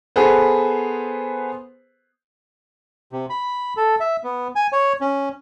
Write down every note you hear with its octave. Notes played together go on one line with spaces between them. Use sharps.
B3 G#4 A4 B4 C5
C3
B5
A4
E5
B3
G#5
C#5
C#4